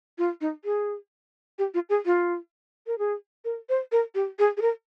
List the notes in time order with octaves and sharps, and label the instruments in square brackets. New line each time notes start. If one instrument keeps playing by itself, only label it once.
[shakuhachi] F4
D#4
G#4
G4
F4
G#4
F4
A#4
G#4
A#4
C5
A#4
G4
G#4
G#4
A#4